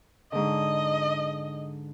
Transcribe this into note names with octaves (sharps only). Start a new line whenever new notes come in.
G#2 D3 D#5